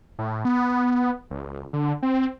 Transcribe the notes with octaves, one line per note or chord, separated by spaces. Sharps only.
A2
B3
C#2
D3
C4